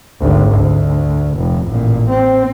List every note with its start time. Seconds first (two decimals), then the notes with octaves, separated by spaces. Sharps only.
0.21 G#1 D2
0.52 D2
1.38 F1
1.68 A1 A#2
2.10 C4